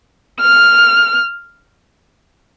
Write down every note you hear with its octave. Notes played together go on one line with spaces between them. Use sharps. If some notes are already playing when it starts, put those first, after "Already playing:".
F6